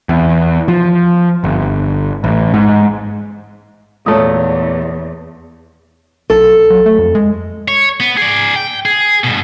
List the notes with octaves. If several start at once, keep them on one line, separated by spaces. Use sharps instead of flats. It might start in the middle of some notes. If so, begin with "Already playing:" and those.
E2
F3
G1
A1
G#2
E2 A#2 A3 C#5 D#6
B1 A4
F#3
A3
F2
G#3
C#5
B3
G#4 D5
G5
G#4
G2 B2